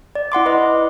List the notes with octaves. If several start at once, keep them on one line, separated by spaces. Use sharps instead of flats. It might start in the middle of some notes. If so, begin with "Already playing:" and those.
D5
E4 F#5 C6 D6
B4 D#5